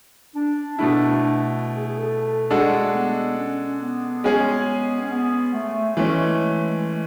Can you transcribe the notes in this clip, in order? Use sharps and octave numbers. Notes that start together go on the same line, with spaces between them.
D4
B2 A3 D4 E4
G#4
G#4
A4
G#3 D4 F#4 A4
E4
A3
B3
C#4
B3
G#3 C#4 G#4
C#4
B3
A3
E3 G#3 A3 C#4
G#3